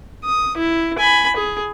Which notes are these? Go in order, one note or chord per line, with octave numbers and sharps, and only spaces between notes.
D#6
E4
G#5 B5
G#4